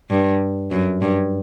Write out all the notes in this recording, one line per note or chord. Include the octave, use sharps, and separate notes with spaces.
G2
F#2
G2